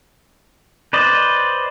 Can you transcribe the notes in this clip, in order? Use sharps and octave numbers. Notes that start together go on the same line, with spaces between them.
B4 C5 D5 D#5